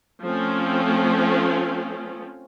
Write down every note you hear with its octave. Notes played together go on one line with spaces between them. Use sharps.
F3 A3 C4 C#4